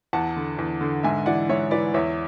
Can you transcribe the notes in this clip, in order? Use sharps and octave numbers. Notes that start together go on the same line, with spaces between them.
E2 F#5 A5
D3
E2
D3
G#2 E5 G#5
E3 D5 F#5
G#2 C#5 E5
E3 B4 D5
E2 C#5 E5